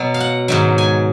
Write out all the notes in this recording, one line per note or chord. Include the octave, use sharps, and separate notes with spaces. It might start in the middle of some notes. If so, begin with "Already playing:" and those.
Already playing: B2 F#3
F5
F#5
G#2 D#3 F#3
G#5